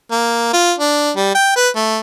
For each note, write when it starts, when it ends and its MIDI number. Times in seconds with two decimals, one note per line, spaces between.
0.11 0.53 58
0.53 0.73 65
0.79 1.11 62
1.16 1.32 55
1.35 1.52 79
1.56 1.69 71
1.76 1.99 57